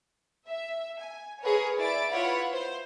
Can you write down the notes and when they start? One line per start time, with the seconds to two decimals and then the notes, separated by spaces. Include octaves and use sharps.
0.48 E5
1.00 G#5
1.42 G#4 A#4 B4 C#5
1.78 E4 D5 A6 D7
2.12 E4 F4 B4 C#5 F#5 B5
2.53 C5